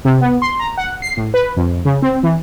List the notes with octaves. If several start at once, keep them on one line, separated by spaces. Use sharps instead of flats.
C3
B3
C6
A#5
F#5
C7
A2
B4
F2
C#3
C4
E3